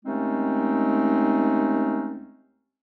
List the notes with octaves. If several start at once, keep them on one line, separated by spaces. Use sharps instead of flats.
D#2 G#3 A3 C4 C#4 D#4